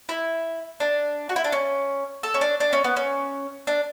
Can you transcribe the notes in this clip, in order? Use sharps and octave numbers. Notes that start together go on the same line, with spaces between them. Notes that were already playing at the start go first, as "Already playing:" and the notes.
E4
D4
F#4
E4
D4
C#4
A4
C#4
D4
D4
C#4
B3
C#4
D4